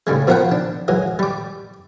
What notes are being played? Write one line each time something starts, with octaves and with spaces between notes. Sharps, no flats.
A2 C#3 G3 G#3
B2 F3 F4 A#4 F#5 G5
D4
E3 F#3 G#3
G3 D6